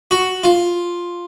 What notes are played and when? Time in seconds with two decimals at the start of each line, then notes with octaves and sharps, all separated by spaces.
0.11 F#4
0.44 F4